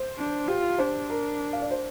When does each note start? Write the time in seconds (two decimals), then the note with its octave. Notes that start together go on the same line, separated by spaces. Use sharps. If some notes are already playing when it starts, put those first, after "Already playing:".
Already playing: C5
0.18 D4
0.48 F4 G4
0.78 D4 C5
1.10 A#4
1.53 F5
1.62 D5
1.71 C5